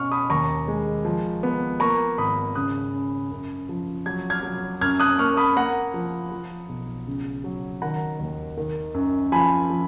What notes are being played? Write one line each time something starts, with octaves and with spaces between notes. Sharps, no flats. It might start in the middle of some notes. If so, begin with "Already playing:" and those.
Already playing: B2 C#4 C#6 F6
B5 D#6
D#2 A#5 C#6
G#3
F3
B3
A#3 A#5 C#6
G#1 B5 D#6
C#3 D#6 F#6
C#4
F#2
F3
F#3 G#6
F6 G#6
F#3
F#2 F6 G#6
D#6 F#6
A#3 C#6 F6
B5 D#6
A#3 F#5 A#5
F3
F3
B1
C#3
F#3
D#3 F#5 A#5
D#2
D#3
F#2
F3 G#5 B5
F3